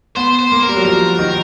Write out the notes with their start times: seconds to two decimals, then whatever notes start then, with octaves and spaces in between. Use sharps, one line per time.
0.17 B3 C5
0.39 C5
0.52 A#3
0.63 A#4
0.69 G3
0.77 F#3
0.85 F3 A#4
1.19 D#3